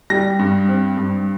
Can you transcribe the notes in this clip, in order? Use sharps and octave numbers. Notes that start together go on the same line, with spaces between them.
G3 A#6
G2
C4
G2